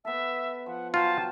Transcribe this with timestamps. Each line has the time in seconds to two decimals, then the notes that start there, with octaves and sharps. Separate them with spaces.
0.05 B3 A4 E5
0.66 F3 F#5
0.94 F#3 F4 F#5 G5 A5